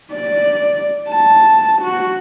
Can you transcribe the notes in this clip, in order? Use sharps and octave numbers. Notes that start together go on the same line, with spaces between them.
D5
A5
F#4